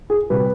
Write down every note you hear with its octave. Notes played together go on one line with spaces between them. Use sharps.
G#4
C3 G3 B4